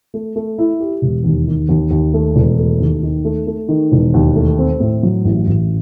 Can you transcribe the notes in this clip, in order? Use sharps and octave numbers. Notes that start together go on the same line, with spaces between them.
A3
A3
E4
G4
E1
D#2
D#3
D#2
D#2
A3
E1
A3
D#2
D#3
A3
A3
D#3
E1
D#2
A3
C4
A2
F#3
A1
A1